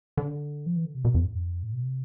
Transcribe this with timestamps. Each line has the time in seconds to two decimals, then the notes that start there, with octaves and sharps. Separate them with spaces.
0.17 D3
0.66 F3
0.75 E3
0.85 D3
0.95 C3
1.05 B2
1.15 F2
1.25 G#2
1.34 F2
1.63 A2
1.73 B2
1.83 C3